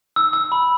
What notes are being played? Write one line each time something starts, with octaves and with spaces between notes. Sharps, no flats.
E6
E6
B5